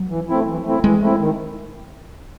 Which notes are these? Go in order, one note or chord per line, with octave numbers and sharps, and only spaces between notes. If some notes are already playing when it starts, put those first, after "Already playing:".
Already playing: F#3
E3
A3 C4 E4
E3
A3 C4 E4
E3 G#3
A3 C4 E4
D#3